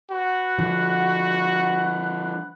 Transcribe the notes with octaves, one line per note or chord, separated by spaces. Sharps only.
F#4 B4 F#5
D3 F3